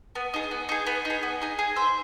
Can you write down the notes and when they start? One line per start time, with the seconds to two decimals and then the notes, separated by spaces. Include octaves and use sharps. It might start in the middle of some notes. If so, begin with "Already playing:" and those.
0.15 B3
0.34 D#4 G#4
0.51 B3
0.69 D#4 G#4
0.87 B3
1.05 D#4
1.10 G#4
1.23 B3
1.41 D#4 G#4
1.59 G#4
1.76 C5 E5